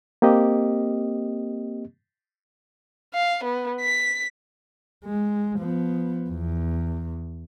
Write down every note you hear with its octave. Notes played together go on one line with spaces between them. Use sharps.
A#3 C4 G4 D#5
F5
B3
B6
G#3
F3 B3
E2